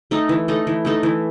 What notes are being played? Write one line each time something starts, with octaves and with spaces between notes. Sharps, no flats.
A3 D#4 A4
E3
A3 D#4 A4
E3
A3 D#4 A4
E3